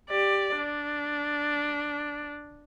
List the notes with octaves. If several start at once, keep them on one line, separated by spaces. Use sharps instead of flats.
G4 D5
D4